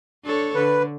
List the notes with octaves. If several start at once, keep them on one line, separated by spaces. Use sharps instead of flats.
D4 A4 C#5
D3 B4